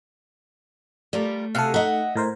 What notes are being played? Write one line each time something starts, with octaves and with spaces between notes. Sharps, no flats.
G3 A3 F4 A#4
C3 F#4 A4 F5 G#5
A3 D#4 D#5 E5 F#5
A2 A#4 C5